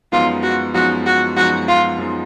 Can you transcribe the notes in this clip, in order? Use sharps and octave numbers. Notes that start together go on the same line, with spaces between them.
F#2 F3 G#3 B3 D#4 F4
F#4
F#2 F3 G#3 B3 D#4 F#4
F#4
F#2 F3 G#3 B3 D#4 F#4
F4
F#2 F3 G#3 B3 D#4